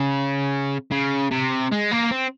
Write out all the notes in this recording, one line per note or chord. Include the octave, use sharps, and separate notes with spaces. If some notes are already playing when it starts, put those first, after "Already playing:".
Already playing: C#3
C#3
C3
G#3
A#3
C4